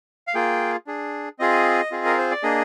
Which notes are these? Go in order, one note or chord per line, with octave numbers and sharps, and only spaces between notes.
F5
A#3 F4 G#4 G5
D4 G#4
C4 F4 G#4 D#5
C4 F4 G#4
A#4
C5
D5
A#3 D4 G#4 D#5